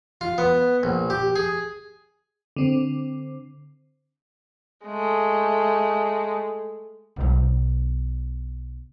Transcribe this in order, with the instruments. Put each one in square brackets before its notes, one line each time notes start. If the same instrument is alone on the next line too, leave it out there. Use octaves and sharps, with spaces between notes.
[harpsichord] F4
B3
A#1
G4
G#4
[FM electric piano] D3 C4
[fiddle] G#3 A3
[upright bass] B1 B3